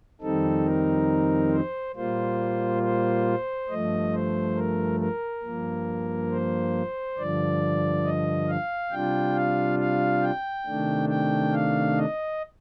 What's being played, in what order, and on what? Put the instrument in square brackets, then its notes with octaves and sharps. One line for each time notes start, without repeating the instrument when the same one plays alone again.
[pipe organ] F2 D#3 G3 C4 D#4 A4
A#4
C5
A#2 G3 A#3 F4 C5
C5
G2 F3 A3 D#5
C5
A#4
A#4
G2 F3 A#3
C5
G2 D3 F3 D5
D#5
F5
C3 G3 D4 F4 G5
F5
F5
G5
C3 D#3 A3 D4
G5
F5
D#5